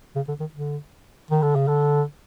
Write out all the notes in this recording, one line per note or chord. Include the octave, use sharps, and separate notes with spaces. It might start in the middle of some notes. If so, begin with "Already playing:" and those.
C#3
D3
D#3
D3
D#3
D3
C#3
D3